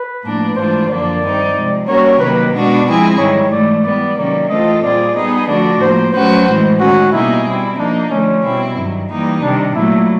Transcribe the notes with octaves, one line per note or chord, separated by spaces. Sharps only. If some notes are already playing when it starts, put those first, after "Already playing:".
Already playing: B4
A2 F3 A#3 D4
G#2 E3 A3 D4 F4 C5
F#2 D3 F3 A#3 D4 D5
G2 D#3 G3 C4 D#4
C3 F3 G#3
G3 A#3 C#4 F#4 A#4 C#5
C3 D#3 F#3 A#3 B4
B2 G#3 B3 D4 F#4
F3 G#3 C4 E4 G#4
G#2 D#3 G3 C#5
G#2 E3 A3 D5
E3 G3 B3 D5
C3 D#3 F#3 A#3 C#4 D5
E3 A3 C4 F4 A4 D#5
A#2 G3 C4 F4 G#4 D5
G3 B3 D#4 G#4 B4 D#5
D3 F3 A3 D4 F#4 D5
A2 F3 A#3 C5
F#3 A3 C#4 F#4 B4 C5
A2 E3 G#3
D#3 G#3 C#4 F#4
B2 G3 A#3 D#4 E4 G#4
G3 C4 E4
F3 A#3 D4 D#4
D3 F3 A3 C#4
B2 G3 C4 E4
G2 D#3 F#3
E3 G3 A#3 D#4
C3 D#3 G3 D4
A#2 F#3 A3 E4